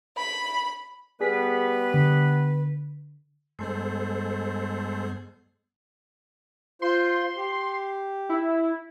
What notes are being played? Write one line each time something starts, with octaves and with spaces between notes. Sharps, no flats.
B5
G3 B3 G#4 B4 B6
D3
G2 G3 G#3 B3 A4 C5
F4 C5 C6
G4
E4